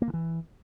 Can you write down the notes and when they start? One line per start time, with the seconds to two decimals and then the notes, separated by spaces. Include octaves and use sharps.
0.02 A#3
0.08 D3
0.14 E3